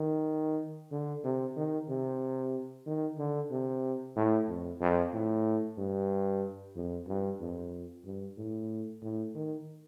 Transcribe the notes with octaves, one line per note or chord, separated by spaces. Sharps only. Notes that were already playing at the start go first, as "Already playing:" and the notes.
Already playing: D#3
D3
C3
D#3
C3
D#3
D3
C3
A2
F2
F2
A2
G2
F2
G2
F2
G2
A2
A2
D#3